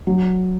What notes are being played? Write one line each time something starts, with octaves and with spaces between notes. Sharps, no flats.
F#3